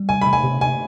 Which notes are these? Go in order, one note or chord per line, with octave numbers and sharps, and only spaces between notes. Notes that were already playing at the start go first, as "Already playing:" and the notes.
Already playing: G3
C3 G#5
C3 B5
G#5
C3
C3 G#5